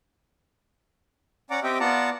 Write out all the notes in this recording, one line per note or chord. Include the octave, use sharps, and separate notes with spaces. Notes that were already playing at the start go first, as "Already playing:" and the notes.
C#4 D5 F#5 A#5 D6
C4 G4 D#5 E5 G5 D6
B3 F4 D5 F#5 A5 A#5